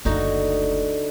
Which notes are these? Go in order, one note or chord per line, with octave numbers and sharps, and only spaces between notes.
F#1 D2 D3 D#4 F#4